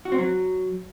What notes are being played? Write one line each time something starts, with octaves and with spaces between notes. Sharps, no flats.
F#4
C4
F#3